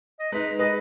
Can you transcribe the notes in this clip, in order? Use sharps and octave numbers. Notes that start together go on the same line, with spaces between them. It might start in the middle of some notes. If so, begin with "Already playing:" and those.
D#5
G#3 D#4 B4
G#4 B4 D#5